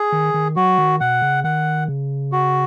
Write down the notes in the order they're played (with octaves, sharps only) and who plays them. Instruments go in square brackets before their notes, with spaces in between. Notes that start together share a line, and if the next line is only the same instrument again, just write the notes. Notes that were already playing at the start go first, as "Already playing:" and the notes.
Already playing: [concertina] G#4
[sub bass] D#3
D#3
[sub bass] F#3 [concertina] F#4
[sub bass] D#3
[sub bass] B2 [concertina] F#5
[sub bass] C#3
[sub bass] D#3 [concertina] F#5
[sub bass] C#3
[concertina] F#4